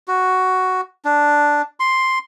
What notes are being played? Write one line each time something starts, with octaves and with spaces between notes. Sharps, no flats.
F#4
D4
C6